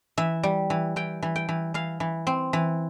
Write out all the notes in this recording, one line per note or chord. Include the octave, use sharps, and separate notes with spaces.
E3 E5
G3
E3
E3 G5
E3
G5
E3
E3 F5
E3
C4
E3